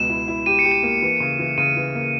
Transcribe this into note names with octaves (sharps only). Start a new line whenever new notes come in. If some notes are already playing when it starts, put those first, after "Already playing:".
Already playing: C#2 B2 E7
E4
E4
G4 D#7
C#7
G4
D#7
A#3
E3
C#3
E3
C#3 D#7
E3
A#3